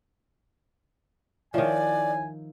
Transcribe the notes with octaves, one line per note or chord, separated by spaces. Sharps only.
D#3 F3 E4 C#5 D5 E5 G#5